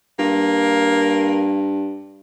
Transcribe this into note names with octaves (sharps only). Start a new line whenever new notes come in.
G2 A#3